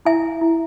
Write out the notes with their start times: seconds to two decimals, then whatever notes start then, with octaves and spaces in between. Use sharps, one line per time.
0.05 E4 E5 G#5
0.41 E4